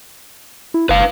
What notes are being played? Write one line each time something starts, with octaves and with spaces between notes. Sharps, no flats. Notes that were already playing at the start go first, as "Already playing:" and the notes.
E4
F#1 B4 F5